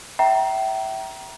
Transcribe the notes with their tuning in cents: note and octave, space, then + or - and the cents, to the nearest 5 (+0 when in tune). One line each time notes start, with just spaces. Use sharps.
E5 +0 G5 -30 A#5 +20